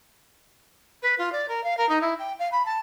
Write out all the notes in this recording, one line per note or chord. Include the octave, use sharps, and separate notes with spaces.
B4
F4
D5
A#4
F5
A#4
D#4
E4
G5
F5
B5
A5